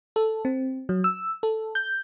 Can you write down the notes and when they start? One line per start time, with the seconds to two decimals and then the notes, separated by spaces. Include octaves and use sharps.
0.16 A4
0.45 C4
0.89 F#3
1.04 E6
1.43 A4
1.75 G6